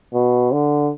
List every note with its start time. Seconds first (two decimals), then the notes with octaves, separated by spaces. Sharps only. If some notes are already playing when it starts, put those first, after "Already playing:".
0.14 B2
0.52 D3